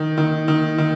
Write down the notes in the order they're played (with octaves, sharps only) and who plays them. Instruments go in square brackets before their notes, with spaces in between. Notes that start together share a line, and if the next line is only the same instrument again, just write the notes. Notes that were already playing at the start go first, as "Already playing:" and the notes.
Already playing: [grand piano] D#3
D#3
D#3
D#3